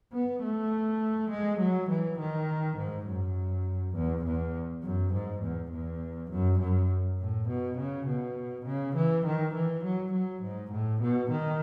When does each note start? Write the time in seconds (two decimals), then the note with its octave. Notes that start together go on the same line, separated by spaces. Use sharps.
0.13 B3
0.42 A3
1.30 G#3
1.60 F#3
1.90 E3
2.19 D#3
2.77 G#2
3.07 F#2
3.95 E2
4.25 E2
4.83 F#2
5.13 G#2
5.43 E2
5.71 E2
6.31 F#2
6.60 F#2
7.19 A2
7.48 B2
7.78 C#3
8.07 B2
8.66 C#3
8.96 E3
9.26 D#3
9.54 E3
9.84 F#3
10.13 F#3
10.42 G#2
10.72 A2
11.01 B2
11.31 D#3